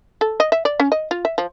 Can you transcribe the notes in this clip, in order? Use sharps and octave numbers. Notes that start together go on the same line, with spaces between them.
A4
D#5
E5
D5
C#4
D#5
F4
E5
F3